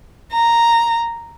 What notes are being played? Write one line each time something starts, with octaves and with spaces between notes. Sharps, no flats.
A#5